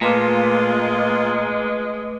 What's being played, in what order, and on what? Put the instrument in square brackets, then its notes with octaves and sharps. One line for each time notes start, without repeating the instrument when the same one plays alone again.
[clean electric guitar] A#2 [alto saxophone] G#3 [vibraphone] A3 B4 D6 [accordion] F4